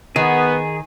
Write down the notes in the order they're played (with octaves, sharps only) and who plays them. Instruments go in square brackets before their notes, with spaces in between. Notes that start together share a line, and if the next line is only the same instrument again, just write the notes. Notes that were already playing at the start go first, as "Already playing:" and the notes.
[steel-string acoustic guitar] D#3 [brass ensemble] B3 [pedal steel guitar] G#4